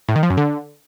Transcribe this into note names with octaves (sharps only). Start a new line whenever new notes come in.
A2
D#3
F3
F#2
D3